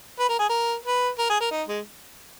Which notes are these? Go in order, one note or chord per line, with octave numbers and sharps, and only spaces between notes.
B4
A#4
G#4
A#4
B4
A#4
G#4
A#4
D#4
G#3